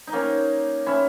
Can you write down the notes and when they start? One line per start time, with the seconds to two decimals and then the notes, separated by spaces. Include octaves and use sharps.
0.07 D#4
0.13 A#3 C#4
0.86 C#4 E4